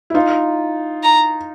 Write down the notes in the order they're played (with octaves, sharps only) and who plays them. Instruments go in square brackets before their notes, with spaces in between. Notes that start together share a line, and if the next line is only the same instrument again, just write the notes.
[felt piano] E4
D#4 F4
[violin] A#5